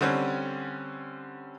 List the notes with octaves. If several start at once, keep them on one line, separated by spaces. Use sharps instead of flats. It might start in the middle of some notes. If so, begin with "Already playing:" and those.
D3 G3 C4 C#4